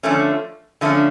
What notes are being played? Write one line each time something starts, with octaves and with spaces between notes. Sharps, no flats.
D3 F3 A3 C#4
D3 F3 A3 C#4